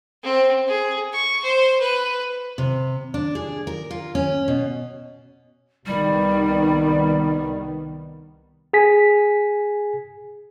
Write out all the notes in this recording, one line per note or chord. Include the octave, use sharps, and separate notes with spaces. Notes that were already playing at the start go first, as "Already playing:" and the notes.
C4
G#4
C#6
C5
B4
C3
D4
G#4
A#4
F4
C#4
B2
C2 D#3 G3 B3
G#4 G#5 B6